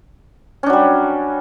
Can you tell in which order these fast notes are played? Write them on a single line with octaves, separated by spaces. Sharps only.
C#4 D4 F#3 G3